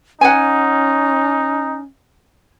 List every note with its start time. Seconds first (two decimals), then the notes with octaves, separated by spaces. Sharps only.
0.21 C#4 D#4 F#5 G#5